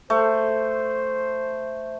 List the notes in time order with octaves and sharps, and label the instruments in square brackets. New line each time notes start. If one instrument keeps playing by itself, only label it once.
[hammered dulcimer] A3 [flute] C5